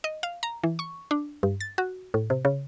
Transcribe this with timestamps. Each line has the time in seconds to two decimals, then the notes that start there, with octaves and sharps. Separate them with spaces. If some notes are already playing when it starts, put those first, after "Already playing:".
0.04 D#5
0.23 F5
0.43 A#5
0.64 E3
0.79 C#6
1.11 D4
1.43 G2
1.60 A6
1.78 F#4
2.14 A2
2.30 C3
2.45 C#3